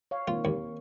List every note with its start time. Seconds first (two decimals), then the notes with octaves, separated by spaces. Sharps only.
0.11 C#5 F5
0.28 D#3 A#3 C4 F4
0.45 D#2